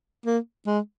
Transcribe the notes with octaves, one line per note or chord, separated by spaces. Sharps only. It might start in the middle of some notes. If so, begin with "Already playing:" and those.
A#3
G#3